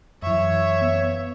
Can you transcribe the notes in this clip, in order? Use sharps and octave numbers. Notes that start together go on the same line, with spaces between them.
F#2 E3 C#5 E5
B3